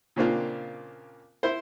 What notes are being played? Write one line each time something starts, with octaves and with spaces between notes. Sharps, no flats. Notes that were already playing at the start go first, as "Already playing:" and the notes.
A#2 C#3 A#3 C4 D4 F4
E4 C5